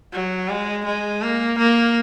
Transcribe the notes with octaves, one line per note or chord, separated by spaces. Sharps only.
F#3
G#3
G#3
A#3
A#3